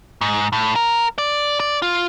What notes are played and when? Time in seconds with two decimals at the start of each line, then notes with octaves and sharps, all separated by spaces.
0.21 G#2
0.53 A2
0.76 A#4
1.18 D5
1.60 D5
1.82 F4